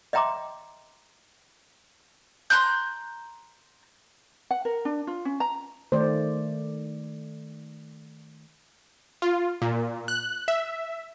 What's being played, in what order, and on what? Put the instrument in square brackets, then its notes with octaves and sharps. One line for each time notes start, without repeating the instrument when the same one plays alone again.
[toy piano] D#5 E5 G5 A#5 C6 D6
[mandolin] A#5 C6 F#6 G6
[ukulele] F#5
A#4
D4
F4
C#4
A#5
[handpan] D#3 A3 D5 [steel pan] C5
[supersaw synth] F4
A#2
F#6
E5